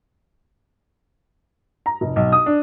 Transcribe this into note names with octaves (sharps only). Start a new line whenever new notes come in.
A#5
F1
B1
D#6
D4